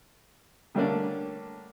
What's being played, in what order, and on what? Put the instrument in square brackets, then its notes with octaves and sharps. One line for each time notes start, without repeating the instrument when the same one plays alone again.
[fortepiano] D3 G3 A3 A#3 C#4 D4